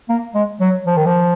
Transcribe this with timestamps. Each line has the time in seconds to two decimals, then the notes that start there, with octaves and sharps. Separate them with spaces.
0.09 A#3
0.35 G#3
0.61 F#3
0.86 F3
0.97 D#3
1.06 F3